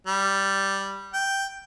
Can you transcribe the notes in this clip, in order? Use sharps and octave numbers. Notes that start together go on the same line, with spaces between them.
G3
G5